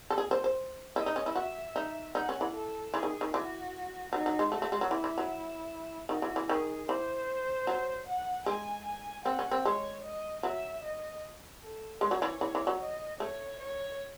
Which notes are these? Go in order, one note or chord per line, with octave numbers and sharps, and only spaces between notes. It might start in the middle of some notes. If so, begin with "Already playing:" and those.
A4
G#4
C5
C5
E4 D#5
D#4
C#4
E4
F#4 E5
D#4
D#4 F#5
C#4
E3
A4
E3 G#4
D#3
D#3
E3 F#4
F#3 D#4
F#3
G#3
A3 F#4
A3
G#3
F#3
E3 E4
E3
F#3
D#3 F#4
E3
E3
D#3 G#4
E3 C5
F#3
F#5
G#3 G#5
G#5
C4 F#5
C#4
C4
G#3 C#5
D#5
F#3 E5
D#5
A4
G#3 C#5
F#3
E3
E3
E3
F#3
D#5
A3 C#5
C#5